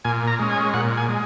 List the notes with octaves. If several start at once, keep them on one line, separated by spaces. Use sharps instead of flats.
A#2 G#5
A#5
G#3 C#4
G#5
A#2 F#5
G#5
G#3